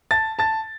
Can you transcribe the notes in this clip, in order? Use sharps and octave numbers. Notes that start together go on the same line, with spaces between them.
A5 A6
A5 A6